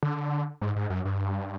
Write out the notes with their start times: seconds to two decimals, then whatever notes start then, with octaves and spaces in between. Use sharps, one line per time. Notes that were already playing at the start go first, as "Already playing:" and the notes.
0.03 D3
0.62 G#2
0.76 G#2
0.90 F#2
1.05 G2